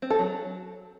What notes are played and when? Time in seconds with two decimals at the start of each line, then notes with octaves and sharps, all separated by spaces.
0.02 C4
0.10 A4
0.19 F#3